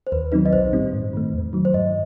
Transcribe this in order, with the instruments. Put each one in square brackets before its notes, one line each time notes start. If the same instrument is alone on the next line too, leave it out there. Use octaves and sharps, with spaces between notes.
[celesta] C5
[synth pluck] D#2 [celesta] B4
[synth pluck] D#3 F#3 C4 D#4 [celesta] B4
[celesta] D#5
[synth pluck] B1 [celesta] C5
[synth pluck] A2 G3 C4 D#4
G2
D#3 A3
E2
D#3 F#3
[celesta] C5
[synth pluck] G2 [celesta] D#5